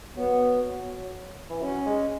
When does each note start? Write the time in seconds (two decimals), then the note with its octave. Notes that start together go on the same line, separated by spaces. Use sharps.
0.16 F#3 B3
1.50 E3
1.62 F#3 C#4
1.86 G#3